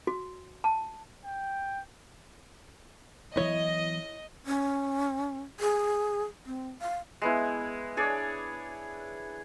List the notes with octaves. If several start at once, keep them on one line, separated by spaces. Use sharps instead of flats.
F#4
A5
G5
E3 F#3 B3 E4 C#5 D#5
C#4
G#4
C4
F5
G#3 B3 E4
D4 G#4 C#5 D5